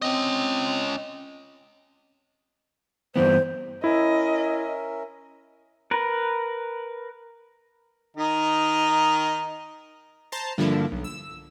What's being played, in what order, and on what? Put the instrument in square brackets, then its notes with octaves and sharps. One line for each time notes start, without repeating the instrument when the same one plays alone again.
[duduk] C4 [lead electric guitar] C#4 D#5
[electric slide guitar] G2 E3 B3 [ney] C5
[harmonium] C#4 A#4 E5 [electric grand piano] E4 [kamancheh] D#5
[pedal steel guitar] A#4 B4
[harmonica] D#3 D#4
[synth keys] C5 A5 A#5 A6 C7
G2 D3 F3 A#3 D4 E4
B1
E6